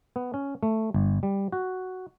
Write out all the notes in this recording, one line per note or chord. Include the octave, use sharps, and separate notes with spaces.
B3
C#4
A3
G1
G3
F#4